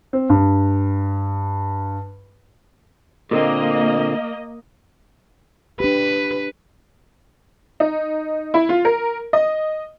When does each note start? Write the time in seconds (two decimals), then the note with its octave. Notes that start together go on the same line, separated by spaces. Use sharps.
0.13 C4
0.30 G2
3.31 A#2 D3 A#3 C4 D#5
5.80 D4 G4 B4
7.80 D#4
8.54 E4
8.69 F4
8.85 A#4
9.33 D#5